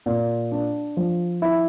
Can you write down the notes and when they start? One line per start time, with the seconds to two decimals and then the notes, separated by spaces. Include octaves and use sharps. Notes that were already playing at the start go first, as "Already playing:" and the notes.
0.06 A#2
0.52 D4
0.97 F3
1.42 E4